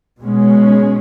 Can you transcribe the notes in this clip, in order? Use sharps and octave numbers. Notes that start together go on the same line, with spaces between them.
B2 G#3 C#4